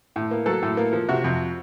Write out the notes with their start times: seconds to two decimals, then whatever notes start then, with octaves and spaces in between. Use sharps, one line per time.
0.16 A2
0.31 A#3
0.46 F#3 A4
0.63 A2
0.77 A#3
0.93 F3
1.09 C3 F#4
1.24 F2